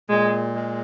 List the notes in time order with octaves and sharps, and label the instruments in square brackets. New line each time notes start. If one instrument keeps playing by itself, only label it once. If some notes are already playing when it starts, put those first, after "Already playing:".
[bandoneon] A#2 [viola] G#3
[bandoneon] G#3